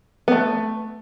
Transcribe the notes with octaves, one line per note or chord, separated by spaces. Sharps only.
B3
A3